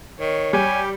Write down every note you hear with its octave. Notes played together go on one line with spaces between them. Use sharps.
D#3 C#5
G3 G4 G#5